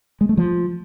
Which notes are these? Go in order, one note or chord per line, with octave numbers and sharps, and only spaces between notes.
G#3
A3
F3